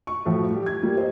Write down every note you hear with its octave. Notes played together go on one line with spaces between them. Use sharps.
C#6
A2 F3 F#3
G3 G4
G#6
G3 A#3
C5 D#5